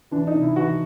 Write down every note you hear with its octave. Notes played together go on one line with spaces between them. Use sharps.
E3 D4
D#4
C3
E4
E3 F#4